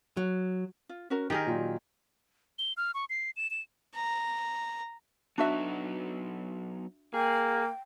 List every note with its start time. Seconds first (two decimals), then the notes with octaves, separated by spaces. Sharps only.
0.17 F#3
0.89 F4
1.10 C#4 F#4 A#4
1.30 D#3 G4 G#4 A#4
1.46 A#2 F#3 F4
2.59 G7
2.77 F6
2.94 C#6
3.10 C7
3.37 E7
3.51 E7
3.95 A#5
5.38 F#3 B3 D4 D#4 F#4 E5
7.14 A#3 G#4 G5